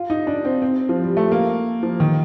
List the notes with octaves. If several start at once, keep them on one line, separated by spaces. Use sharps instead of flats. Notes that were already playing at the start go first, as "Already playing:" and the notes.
Already playing: F4
D#4
D4
C4
C4
F3
G3
A3
A#3
F3
D#3